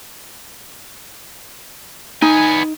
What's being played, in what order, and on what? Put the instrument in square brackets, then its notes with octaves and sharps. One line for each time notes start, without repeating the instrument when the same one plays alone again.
[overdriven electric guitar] B3 G#5 [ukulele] D#4